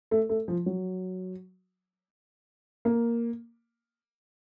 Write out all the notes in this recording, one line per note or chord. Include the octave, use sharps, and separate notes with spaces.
A3
A3
F3
F#3
A#3